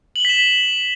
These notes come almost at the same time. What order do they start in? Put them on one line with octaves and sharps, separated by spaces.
F#7 G7 B6 E7